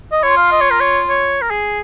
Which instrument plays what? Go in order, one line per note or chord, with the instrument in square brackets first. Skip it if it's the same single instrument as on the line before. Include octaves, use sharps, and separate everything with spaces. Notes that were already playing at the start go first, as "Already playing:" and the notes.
[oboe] D#5
[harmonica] F4 [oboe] C#5
[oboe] F5
D#5
C#5
A#4
C#5
C#5
A#4
G#4